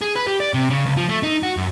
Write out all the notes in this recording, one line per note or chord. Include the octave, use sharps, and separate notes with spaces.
G#4
B4
G4
D5
C3
C#3
C#2
F3
A3
D#4
F#4
F#2